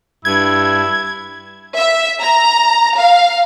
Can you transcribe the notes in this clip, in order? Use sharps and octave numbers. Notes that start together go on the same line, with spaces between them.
G2 E4 G#6
E5
A#5
F5